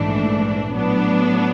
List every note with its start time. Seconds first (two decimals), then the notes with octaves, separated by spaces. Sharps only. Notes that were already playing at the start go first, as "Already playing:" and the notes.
Already playing: A#1 G#2 E3 A3 D4
0.74 A2 F#3 B3 D4